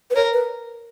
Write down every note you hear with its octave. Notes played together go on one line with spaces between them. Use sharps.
B4
A#4 C#5
B4